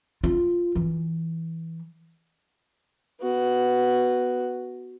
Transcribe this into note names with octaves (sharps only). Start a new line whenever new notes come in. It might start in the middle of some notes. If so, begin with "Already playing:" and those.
F4
E3
B3 F#4